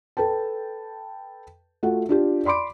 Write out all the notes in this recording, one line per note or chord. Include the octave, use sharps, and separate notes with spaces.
A4 B4 G5 A5
A3 F4 F#4 F#5
D4 F4 G4
D5 B5 C6 D6 D7